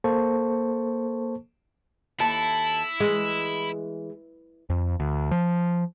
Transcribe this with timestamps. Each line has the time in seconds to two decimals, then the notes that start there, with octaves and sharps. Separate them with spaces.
0.04 A#3 A4 C5 A5 C#6
2.20 D#2 E4 A4 A5
3.00 E3 G#3
4.70 F2
5.00 D2
5.31 F3